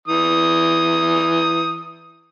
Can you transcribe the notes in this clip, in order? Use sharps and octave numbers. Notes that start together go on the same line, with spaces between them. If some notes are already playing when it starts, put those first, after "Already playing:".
E3 D#6